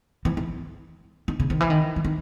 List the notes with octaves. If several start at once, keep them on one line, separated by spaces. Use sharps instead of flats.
E3
E3
D#3
C#3
D#3
E3
D#3
E3
D#3